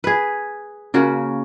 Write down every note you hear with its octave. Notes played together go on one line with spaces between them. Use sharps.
G#4 B4
C#3 A#3 F#4